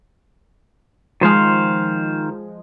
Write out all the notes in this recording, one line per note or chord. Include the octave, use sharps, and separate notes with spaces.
D#3 F3 G#3 C5 F5